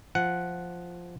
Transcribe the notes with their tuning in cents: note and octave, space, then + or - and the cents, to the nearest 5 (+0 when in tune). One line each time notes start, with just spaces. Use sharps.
F3 +0 F#5 +0